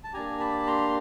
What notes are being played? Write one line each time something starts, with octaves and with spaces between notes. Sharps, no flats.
A5
A#3 D4 G4 G#5 A#5
A5 B5
A#5 C6